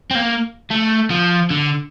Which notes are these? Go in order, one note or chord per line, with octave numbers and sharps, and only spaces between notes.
C4
A#3
A3
F3
D3